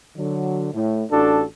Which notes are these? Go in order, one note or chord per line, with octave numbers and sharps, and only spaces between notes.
D3 F#3
A2
A1 D4 F#4 A4